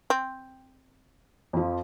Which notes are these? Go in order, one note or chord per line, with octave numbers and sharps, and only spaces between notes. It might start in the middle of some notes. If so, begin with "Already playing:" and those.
C4
F2 F3